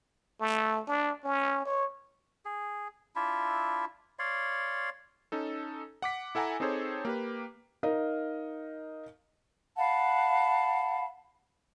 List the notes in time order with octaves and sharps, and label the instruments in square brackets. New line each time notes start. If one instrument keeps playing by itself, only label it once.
[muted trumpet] A3
D4
C#4
C#5
[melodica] G#4
D4 E4 F4 E5
C#5 D5 F5 C6
[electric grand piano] C#4 D#4 A4
F#5 D6 B6
E4 A4 F#5 G#5 A#5 D6
C4 D#4 G#4 A4 C5 C#5
A#3 G4 B4
[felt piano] D#4 A#4 D#5 F5
[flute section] F5 F#5 A5 B5